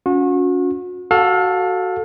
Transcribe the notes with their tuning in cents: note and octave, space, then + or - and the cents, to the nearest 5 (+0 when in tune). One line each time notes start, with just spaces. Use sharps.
C#4 +25 F#4 -35
F#4 +10 A4 +0 F5 +35